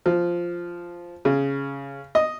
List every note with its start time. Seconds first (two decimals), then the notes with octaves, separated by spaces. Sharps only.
0.06 F3
1.25 C#3
2.15 D#5